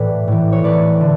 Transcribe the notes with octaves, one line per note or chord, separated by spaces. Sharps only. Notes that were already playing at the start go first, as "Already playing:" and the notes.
Already playing: A2 E3 A4 B4 D5
A2 E3
C#5
A2 E3 B4 D5
D3